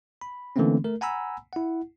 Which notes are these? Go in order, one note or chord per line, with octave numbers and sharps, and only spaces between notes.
B5
D3 E3 A3 A#3 C4 C#4
A3 A#4
F#5 G#5 A#5 B5 E6
E4 F#5